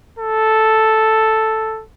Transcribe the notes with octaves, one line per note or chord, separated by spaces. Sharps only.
A4